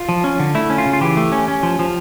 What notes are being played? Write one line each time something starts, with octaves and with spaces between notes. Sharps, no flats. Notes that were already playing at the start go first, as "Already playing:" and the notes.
Already playing: F4
F3
C#4
D3
A3 E4
C#4
F4
C#3
F4
E3 G4
A3
C#4
C#4
F3
F3